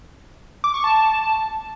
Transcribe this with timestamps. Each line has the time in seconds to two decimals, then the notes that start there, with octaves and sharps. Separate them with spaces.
0.64 D6
0.74 C#6
0.84 A5